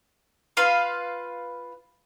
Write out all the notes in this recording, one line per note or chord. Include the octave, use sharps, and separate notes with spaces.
F4 B4 F5